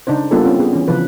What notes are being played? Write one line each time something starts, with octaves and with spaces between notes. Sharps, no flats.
C#3 D4 D#4 C5
G3 A#3 B3 D4 F4 A4
C4 C#4 F4
B3 G#4
E3 C#4
C#3 E3 F3 B4